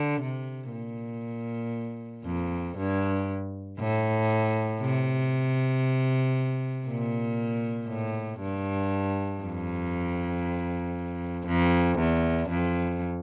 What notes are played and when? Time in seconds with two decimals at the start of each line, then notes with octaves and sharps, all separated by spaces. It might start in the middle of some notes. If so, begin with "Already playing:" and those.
Already playing: D3
0.21 C3
0.71 A#2
2.25 F2
2.77 G2
3.79 A2
4.81 C3
6.86 A#2
7.88 A2
8.40 G2
9.42 F2
11.47 F2
11.98 E2
12.50 F2